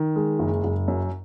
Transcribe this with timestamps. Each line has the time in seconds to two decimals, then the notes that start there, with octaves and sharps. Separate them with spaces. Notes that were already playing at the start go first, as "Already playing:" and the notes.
Already playing: D#3
0.16 G#3
0.39 F#1
0.64 F#1
0.88 F#2